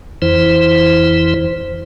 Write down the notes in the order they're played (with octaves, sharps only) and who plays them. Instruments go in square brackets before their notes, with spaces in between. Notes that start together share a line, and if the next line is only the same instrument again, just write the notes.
[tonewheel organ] F2 E3 E4 C5